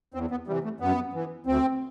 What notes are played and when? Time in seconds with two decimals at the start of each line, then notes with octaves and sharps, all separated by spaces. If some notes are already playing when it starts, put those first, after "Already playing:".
0.14 E2 C4
0.31 B3
0.47 C3 E3 G3
0.64 A3
0.80 F#2 B3
1.13 E3
1.46 D2 C4